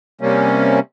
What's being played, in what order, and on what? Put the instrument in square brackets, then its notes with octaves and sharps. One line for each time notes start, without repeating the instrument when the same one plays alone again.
[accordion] C3 G3 A#3 C#4